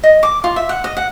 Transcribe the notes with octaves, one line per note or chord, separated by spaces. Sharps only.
D#5
D6
F4
E5
F#5
D#5
F#5